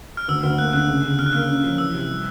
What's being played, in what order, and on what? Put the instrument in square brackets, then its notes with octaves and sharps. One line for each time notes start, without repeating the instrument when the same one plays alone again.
[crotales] F6
[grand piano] D2 [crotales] E6
[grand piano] D2 [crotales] F6
[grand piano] A#3 [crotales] F#6
[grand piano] D3 [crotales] F#6
[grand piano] C#3
C#3
[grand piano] D3 [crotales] F6
[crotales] F#6
[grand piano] A#3 [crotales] F6
[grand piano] C#4
F3
[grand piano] E3 [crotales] E6
[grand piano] C3
G3